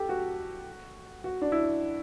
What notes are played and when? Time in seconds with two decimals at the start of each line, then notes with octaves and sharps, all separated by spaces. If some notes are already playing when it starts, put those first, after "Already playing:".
Already playing: G4 A4
0.09 F#4
1.24 F#4
1.42 D4
1.52 E4